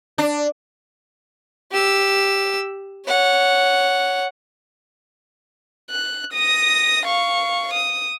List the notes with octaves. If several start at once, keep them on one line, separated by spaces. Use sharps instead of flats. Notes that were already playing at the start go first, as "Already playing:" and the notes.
D4
G4 E6
C#5 F#5
F#6
D#6 A#6
F5 C#6
D#6